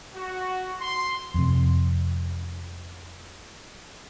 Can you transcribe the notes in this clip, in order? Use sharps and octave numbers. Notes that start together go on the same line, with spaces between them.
F#4
C6
F2 C3